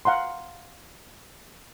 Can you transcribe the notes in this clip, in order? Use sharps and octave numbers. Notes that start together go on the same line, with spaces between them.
F5 F#5 A#5 C6